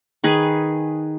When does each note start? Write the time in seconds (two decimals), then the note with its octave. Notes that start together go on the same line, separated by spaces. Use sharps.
0.24 D#3 G#4 B4